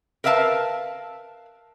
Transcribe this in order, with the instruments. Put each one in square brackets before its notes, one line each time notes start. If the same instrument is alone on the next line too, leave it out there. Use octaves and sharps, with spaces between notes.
[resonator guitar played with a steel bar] A#4 B4 E5 F5 A5